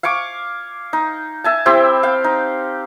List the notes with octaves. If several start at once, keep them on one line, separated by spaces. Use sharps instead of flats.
F5 G#5 C#6 D6
D#4
E5 G#5 A5
C4 E4 G4 C5
F5 G5
D#4